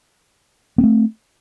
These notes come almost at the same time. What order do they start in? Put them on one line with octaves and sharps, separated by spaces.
B3 C4 A3